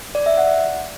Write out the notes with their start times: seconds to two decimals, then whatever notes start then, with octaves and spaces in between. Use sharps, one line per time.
0.15 D5
0.26 E5
0.38 F#5